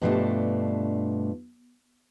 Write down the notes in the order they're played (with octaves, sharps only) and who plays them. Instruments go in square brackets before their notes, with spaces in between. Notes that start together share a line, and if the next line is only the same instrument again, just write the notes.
[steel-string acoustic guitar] G2 B2 F3 G#3 A3 D4